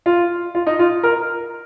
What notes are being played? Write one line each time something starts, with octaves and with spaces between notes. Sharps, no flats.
F4
F4
D#4
F4
A#4